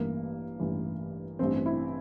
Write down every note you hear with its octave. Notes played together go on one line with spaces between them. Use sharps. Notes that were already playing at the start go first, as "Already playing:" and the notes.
Already playing: A1 G2 E3 A#3
A1 G2 E3
A1 G2 E3 C4
E4